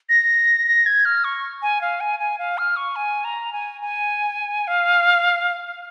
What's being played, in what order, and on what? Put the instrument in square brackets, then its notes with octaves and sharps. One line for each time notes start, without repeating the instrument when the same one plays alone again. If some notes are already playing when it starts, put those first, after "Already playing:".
[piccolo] A#6
A#6
G#6
F6
C#6
G#5
F5
G#5
G#5
F5
F6
C#6
G#5
A#5
G#5
G#5
F5